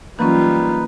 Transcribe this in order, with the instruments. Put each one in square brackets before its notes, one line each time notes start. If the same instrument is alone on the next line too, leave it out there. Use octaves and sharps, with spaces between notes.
[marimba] E3 F#3 C#4 [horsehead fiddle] G3 F4 [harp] A#3 [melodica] D#4 B4